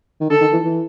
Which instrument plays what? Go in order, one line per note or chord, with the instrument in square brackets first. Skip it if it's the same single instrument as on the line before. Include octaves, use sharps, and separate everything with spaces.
[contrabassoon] D#3
[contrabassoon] D3 [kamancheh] A4
[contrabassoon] D#3
E3
E3